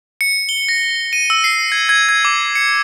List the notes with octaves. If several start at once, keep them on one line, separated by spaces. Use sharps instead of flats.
C#7
G7
A#6
D#7
E6
C7
G#6
G#6
G#6
D6
C#7